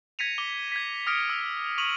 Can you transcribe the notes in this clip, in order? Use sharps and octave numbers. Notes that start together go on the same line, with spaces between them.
G#6 A#6 B6 C#7 D#7 F7
D6 G7
G#6 B6
D#6 F6 A#6 C#7 D7
E6
C#6 D#6 D#7 F7 F#7